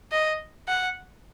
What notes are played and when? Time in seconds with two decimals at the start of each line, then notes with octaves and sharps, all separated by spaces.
0.12 D#5
0.68 F#5